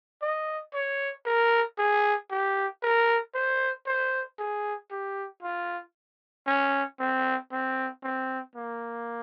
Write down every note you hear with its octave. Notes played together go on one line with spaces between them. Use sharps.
D#5
C#5
A#4
G#4
G4
A#4
C5
C5
G#4
G4
F4
C#4
C4
C4
C4
A#3